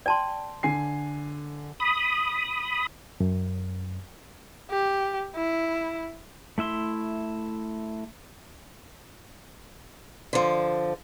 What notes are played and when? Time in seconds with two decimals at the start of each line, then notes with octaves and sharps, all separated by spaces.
0.06 D5 G5 A5 C6
0.63 D3 G#5 C7
1.80 B5 D#6
3.20 F#2
4.70 G4
5.35 E4
6.58 A3 E4 E5 C6
10.33 D3 F3